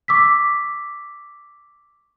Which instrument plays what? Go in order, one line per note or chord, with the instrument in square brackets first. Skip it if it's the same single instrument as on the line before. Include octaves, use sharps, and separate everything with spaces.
[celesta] C#6 D6 E6 B6